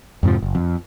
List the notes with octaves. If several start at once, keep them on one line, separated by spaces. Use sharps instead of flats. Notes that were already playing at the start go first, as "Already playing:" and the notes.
F2 G#2 C3 F3
F#1
F2